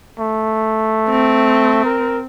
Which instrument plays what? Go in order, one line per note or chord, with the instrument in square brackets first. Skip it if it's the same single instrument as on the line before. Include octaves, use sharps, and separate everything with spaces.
[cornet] A3
[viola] C4
[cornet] A#4